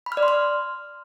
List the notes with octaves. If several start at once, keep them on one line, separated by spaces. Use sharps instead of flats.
B5
F6
D5
C6
F6